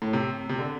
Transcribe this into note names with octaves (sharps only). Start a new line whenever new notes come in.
A2
C3
C3
D3